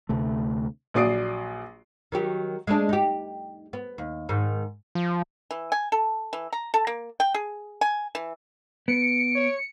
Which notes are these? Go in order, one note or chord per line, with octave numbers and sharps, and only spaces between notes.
D2 C3 A3
A#1 F#3 D5 D#6 C7 D7
D#3 F#3 G4
G#3 A3 D4
D#4 G4
B3
D#2
G#2 D#3
F3
E3
G#5
A4
E3
A#5
A4
A#3
G5
G#4
G#5
E3
B3 C#7 D7
C#5